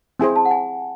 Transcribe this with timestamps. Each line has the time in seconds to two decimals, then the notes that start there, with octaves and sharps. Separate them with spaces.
0.20 C4 E4 G#4 C5 G#5
0.36 A5
0.45 F#5
0.51 G#5